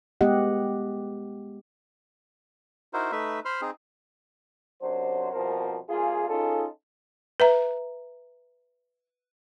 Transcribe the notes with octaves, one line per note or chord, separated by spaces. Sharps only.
G#3 B3 G4 D#5 F#5
D#4 E4 F#4 A#4 C5
A3 D#4 B4 E5
C5 B5 C6 F6
C4 D#4 G#4
F#2 C3 F#3 D4 C5
C2 B2 F3 C4 A#4 C5
C2 A#3 F4 G#4
C#4 D#4 F4 G#4 A4
B4 E5 A#5